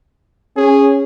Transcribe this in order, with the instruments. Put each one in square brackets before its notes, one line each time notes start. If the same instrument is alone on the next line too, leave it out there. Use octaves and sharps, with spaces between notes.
[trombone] C#4 [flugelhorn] G#4